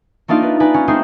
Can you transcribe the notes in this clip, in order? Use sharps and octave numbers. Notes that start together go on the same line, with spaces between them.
A3 A#3 D4 D#4 F4 F5
B4
D#4 B4 D5 G#5
C#4
G#3 A3 C4 D#4 G#4 C5